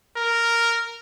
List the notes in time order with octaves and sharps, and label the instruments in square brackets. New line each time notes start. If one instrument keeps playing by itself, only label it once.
[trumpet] A#4